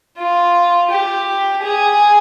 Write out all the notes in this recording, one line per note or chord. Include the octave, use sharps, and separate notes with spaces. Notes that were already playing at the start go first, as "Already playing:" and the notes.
F4
G4
G#4